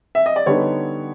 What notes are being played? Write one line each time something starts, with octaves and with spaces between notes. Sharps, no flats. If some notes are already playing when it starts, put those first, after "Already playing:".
E5
D#5
D5
D3 G3 B3 D#4 C#5